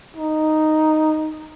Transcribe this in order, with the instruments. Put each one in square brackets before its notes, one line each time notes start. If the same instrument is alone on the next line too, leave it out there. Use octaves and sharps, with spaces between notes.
[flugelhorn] D#4